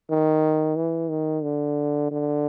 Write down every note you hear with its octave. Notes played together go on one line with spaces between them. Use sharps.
D#3
E3
D#3
D3
D3